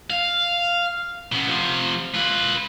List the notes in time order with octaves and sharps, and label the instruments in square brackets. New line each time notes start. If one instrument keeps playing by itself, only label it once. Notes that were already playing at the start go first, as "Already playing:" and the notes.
[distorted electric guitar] F5
C#3 B3
C3 F3
F4 B4